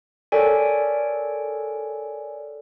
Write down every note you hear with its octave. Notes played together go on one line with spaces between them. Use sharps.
A4 A#4 C#5 D5 G5 G#5